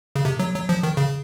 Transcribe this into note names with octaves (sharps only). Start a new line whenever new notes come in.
C#3
C3
F#3
F#3
F3
D#3
C#3